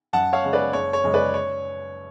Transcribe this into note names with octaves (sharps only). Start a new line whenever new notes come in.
F#2 F#5 A5
C#5 F5
C#3 G#3
B4 D5
F#1 C#5
C#5
F#2 C#3 G#3
B4 D5
C#5